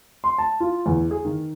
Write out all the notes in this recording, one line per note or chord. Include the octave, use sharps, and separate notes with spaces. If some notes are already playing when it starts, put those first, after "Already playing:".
C6
A5
F4
E2
G#4
D#3